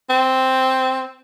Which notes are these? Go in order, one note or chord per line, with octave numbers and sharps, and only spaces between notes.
C4